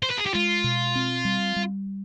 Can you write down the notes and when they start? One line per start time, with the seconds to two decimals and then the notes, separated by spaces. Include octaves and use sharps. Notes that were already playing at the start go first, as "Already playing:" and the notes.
0.03 C5
0.11 B4
0.18 G#4
0.26 G4
0.34 G#3 F4
0.64 B2
0.96 C4
1.25 G3
1.56 G3